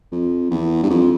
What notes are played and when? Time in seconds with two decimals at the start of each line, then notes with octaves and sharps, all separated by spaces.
0.12 F2
0.51 E2
0.83 G2
0.90 F2